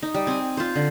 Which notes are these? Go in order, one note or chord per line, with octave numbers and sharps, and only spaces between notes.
D#4
G3
C4 G#5
F4 C5
D3